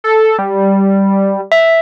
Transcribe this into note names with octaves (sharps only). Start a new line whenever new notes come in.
A4
G3
E5